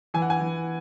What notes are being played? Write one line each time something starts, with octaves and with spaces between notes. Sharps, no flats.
E3 G#5
F#5
G#5
E3